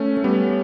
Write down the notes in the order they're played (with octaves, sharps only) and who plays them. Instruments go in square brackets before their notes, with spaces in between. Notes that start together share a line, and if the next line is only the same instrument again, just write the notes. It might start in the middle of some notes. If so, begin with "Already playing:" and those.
Already playing: [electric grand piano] A3 C#4
A3
G3 B3